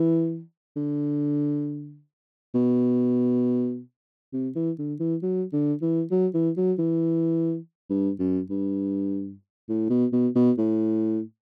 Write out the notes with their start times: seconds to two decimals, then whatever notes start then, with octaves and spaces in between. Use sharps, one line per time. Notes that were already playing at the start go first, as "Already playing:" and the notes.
Already playing: E3
0.76 D3
2.55 B2
4.33 C3
4.55 E3
4.79 D3
5.00 E3
5.22 F#3
5.53 D3
5.82 E3
6.11 F#3
6.34 E3
6.57 F#3
6.79 E3
7.90 G2
8.19 F#2
8.50 G2
9.69 A2
9.90 B2
10.13 B2
10.36 B2
10.58 A2